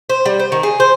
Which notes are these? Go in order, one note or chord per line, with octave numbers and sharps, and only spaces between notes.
C5
G3
C5
D#3
G#4
C5